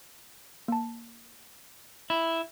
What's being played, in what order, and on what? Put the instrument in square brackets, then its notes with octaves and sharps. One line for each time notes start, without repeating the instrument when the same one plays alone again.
[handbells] A#3 A5
[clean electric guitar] E4